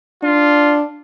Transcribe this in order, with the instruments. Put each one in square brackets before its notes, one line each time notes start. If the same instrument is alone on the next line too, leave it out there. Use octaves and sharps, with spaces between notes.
[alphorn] D4 [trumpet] F4